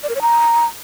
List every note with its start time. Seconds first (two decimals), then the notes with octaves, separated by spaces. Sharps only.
0.03 D5
0.09 A#4
0.15 C#5
0.22 A#5